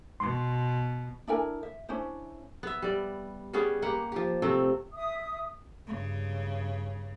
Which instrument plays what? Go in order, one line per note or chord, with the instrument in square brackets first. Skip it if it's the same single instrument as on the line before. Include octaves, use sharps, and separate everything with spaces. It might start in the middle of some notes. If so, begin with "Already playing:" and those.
[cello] B2 [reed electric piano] C6
[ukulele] D4 E4 A#4 G#5
E5
C#4 D4 E4 C5
[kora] B3 E5
G3 D5
G3 B3 C#4 G#4
A#3 G4 F#5
F3 G4
C3 A3 C4
[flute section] E5 D#6
[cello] G2 C#3